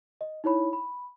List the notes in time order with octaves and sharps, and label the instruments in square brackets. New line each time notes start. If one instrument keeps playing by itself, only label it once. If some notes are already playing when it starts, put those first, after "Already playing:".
[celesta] D#5
D#4 E4 C#5 B5
B5